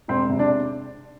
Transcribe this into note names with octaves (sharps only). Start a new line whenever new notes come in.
E1 C4
C3
D4